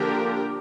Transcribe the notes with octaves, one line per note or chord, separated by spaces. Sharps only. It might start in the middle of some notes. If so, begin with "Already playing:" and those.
Already playing: D3 F3 A#3 D4 G4 A#4